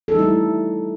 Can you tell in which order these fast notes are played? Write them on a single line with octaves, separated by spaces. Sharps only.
A4 D#4 G3 E4 A3